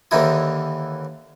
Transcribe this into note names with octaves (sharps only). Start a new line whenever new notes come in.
D#2 D3 E3 D#4 E4 D#6